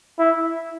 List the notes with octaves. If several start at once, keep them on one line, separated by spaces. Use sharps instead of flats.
E4